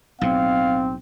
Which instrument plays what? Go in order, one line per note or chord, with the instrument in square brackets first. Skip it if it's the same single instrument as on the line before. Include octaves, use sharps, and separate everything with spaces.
[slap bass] B1 A2 [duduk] C4 [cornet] F5